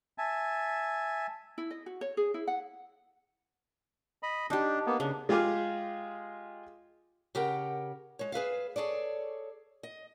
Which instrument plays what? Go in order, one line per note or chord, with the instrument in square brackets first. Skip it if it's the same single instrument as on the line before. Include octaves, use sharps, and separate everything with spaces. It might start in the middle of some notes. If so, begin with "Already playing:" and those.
[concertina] E5 G#5 A5
[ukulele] E4
D#5
F#4
C#5
G#4
E4
F#5
[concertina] D#5 B5
[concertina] D4 [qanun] D#4 G4
[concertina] A#3 B3
[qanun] C#3 [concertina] D4
[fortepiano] G#3 F4 G4 G#4 D6 F6
[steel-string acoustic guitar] C#3 G4 A#4 F#5 G5
G#3 C#5
G#4 B4 E5 F5
G#4 A4 C#5 D5
D#5